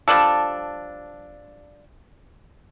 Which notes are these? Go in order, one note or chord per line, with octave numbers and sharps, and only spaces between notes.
F3 G3 D4 A4